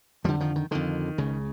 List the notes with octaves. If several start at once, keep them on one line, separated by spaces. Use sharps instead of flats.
F2 D3 F3 G3
D#3 F3
D#3
F2 D3 D#3
C#2 C#3